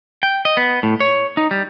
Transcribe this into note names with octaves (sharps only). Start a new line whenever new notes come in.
G5
D#5
B3
A2
C#5
D#4
G3